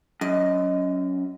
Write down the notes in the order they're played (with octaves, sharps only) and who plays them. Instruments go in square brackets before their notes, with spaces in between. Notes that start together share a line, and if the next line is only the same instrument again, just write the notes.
[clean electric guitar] F#2 [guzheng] D#5